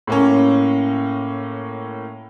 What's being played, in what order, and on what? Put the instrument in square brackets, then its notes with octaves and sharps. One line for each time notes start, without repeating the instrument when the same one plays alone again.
[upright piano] A2 A#3 C#4